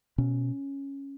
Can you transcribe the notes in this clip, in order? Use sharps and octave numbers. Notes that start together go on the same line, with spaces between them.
B2 C#4